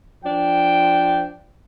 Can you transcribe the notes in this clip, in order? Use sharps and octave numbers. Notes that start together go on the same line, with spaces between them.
F3 D4 G5